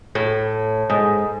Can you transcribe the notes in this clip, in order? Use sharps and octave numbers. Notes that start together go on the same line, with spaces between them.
A2
G#2